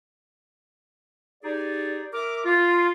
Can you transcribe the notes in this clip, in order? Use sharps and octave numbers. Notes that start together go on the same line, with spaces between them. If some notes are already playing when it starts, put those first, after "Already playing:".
D#4 G4 G#4 D5
A#4 E5 D6
F4